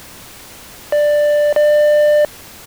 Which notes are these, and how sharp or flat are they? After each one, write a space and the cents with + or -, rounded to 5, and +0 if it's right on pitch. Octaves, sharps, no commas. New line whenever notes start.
D5 +10
D5 +25